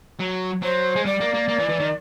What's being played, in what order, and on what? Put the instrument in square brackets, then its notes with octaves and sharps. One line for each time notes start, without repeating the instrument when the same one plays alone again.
[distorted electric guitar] F#3
[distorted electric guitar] F#3 [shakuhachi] C5
[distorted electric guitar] G#3
[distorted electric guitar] G3 [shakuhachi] D5
[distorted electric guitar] A#3
A#3
A#3
E3
E3
D#3